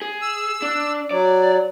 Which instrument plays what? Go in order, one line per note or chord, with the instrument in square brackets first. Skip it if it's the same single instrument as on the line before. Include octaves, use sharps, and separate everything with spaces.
[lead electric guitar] G#4
[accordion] E6
[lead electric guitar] D4
[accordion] F#3 [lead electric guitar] D5